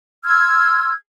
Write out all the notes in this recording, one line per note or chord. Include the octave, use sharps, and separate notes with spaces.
C6 E6 F6 G#6